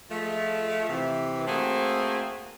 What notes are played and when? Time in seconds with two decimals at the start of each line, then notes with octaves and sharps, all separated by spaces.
0.11 F3 G#3 A3
0.90 C3 E3
1.47 A3 A#3 C4 F#4 G#4